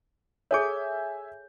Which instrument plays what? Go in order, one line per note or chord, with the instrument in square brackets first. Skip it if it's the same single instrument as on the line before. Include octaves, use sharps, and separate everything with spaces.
[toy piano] G#4 A4 C#5 [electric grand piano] E5 G#5 G6